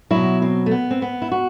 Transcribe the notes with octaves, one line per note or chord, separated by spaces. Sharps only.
F#3 E4
B2
C4
A3
B3
C4
B3
E4
F#4